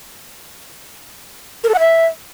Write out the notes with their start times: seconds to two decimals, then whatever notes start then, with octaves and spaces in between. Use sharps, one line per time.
1.64 A#4
1.69 A4
1.74 F#5
1.79 E5